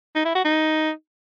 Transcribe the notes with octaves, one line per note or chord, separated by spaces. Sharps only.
D#4
E4
F#4
D#4